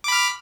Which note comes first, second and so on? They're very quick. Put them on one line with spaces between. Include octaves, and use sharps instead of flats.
D6 B5 F6